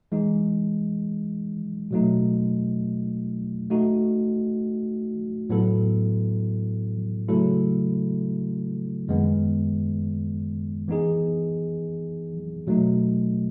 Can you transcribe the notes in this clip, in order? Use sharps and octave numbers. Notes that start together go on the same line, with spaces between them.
E3 G#3 D#4
B2 F#3 A3 D#4
A3 D#4 F#4
A2 F#3 B3 E4 A4
C#3 F#3 A3 E4 A4
F#2 D#3 G#3 B3
E3 B3 D#4 G#4
B2 F#3 A3 D#4